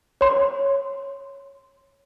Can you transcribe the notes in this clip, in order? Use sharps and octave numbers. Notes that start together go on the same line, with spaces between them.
C#5 C6